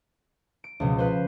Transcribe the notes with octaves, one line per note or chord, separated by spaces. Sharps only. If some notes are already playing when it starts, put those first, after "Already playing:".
D7
C#2 B2 F3
B4 C5